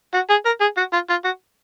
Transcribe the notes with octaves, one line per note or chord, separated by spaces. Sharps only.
F#4
G#4
A#4
G#4
F#4
F4
F4
F#4